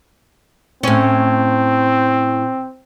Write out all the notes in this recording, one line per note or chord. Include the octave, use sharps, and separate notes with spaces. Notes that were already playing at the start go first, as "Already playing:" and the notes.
A2 C4 C#4